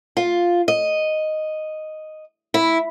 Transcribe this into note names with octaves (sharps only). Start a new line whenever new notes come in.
F4
D#5
E4